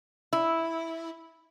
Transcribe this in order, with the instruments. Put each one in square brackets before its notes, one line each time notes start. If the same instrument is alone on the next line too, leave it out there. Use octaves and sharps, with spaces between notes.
[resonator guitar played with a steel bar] E4